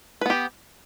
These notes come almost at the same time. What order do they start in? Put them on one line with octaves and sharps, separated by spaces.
B4 B3 G4